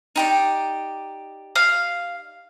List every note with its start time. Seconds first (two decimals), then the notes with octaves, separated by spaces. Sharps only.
0.16 D#4 G4 D5
1.55 F5